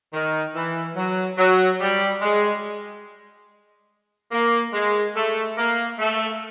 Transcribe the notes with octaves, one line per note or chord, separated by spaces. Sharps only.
D#3
E3
F#3
F#3
G3
G#3
A#3
G#3
A3
A#3
A3